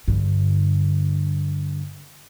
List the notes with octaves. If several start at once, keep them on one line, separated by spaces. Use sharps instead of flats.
G2 D3